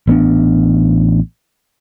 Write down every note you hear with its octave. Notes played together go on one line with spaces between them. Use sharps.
A1 B3 D4